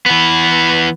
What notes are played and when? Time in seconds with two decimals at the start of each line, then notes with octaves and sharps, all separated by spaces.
0.06 E3 B3